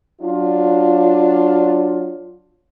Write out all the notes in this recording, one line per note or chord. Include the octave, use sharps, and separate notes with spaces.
F#3 D4 F4